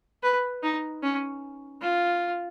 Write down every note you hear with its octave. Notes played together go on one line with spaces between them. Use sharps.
B4
D#4
C#4
F4